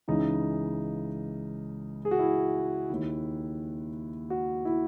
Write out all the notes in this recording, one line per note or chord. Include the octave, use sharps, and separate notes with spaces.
C#2 C#3 E3 D#4
G#4
F#4
E4
D#2 D#3
F#4
E4